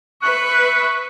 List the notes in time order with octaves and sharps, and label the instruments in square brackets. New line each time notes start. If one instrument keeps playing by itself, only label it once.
[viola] B4 E5 [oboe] C#6 [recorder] F#6